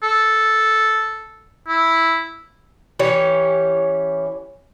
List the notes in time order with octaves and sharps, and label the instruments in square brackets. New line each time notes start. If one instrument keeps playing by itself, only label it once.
[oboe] A4
E4
[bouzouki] E3 C#4 G4 C#5